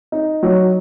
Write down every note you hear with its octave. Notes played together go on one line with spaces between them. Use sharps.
D#4
F#3